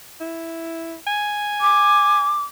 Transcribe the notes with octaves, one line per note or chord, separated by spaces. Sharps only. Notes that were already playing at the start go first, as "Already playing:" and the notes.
E4
G#5
D6